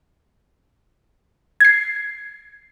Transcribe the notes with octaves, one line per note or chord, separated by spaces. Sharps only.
G#6 C7